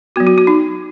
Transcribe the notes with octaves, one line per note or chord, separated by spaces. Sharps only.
F#3 B3 F#4
F#4
F#4
D#4